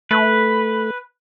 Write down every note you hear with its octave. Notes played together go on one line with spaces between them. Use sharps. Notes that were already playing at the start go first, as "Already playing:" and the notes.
A3 B4